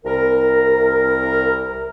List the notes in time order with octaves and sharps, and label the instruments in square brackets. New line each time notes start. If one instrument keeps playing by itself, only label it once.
[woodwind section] C2 A#4